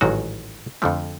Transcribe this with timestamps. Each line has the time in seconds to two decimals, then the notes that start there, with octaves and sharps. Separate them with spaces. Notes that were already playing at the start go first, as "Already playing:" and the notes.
0.01 A1 G#2 D#3 F#3 F#4
0.82 F2 D3 F3 A3